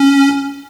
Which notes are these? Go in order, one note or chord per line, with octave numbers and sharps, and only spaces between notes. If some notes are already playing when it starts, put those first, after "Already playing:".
Already playing: C#4